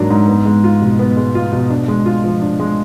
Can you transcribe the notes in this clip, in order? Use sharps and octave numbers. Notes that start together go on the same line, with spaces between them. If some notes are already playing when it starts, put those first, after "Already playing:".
Already playing: G#2 F#3 A#3 D4
G#2
B3
G#3
F4
B2
B3
G#3
F4
B2
D4
G#3
F4
F3
D4
G#3